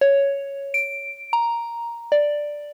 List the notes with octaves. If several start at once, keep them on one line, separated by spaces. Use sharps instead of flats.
C#5
D7
A#5
D5